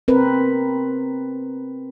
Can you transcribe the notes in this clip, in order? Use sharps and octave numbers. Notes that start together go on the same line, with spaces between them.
C4 A#4 B4